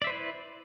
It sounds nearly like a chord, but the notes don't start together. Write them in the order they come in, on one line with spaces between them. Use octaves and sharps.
D5 E5 C5 B4 E4